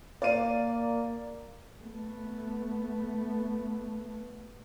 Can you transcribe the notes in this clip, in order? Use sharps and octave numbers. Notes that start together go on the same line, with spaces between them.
A#3 D5 F5 D#7
A3 B3